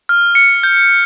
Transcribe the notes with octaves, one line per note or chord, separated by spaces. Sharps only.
F6
C#7
G6